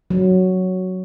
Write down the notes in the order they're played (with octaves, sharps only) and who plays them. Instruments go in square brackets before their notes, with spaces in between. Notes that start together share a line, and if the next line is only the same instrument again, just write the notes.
[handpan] F#3